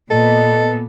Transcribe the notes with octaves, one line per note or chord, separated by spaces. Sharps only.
A#2 B3 A4 D#5